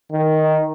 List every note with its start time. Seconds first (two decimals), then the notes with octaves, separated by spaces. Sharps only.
0.12 D#3